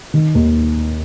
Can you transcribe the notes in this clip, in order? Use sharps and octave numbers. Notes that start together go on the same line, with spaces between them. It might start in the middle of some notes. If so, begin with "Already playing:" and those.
D#3
D#2